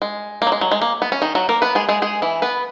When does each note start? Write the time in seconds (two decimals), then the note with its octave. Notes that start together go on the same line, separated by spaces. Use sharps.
0.02 G#3
0.42 A#3
0.47 F#3
0.52 G#3
0.61 F#3
0.71 G#3
0.81 A#3
1.02 B3
1.12 C#4
1.22 D#3 D#4
1.35 F#3 F#4
1.49 A#3 A#4
1.62 B3 B4
1.75 G#3 G#4
1.89 G#3 G#4
2.02 G#3 G#4
2.22 E3 E4
2.42 B3 B4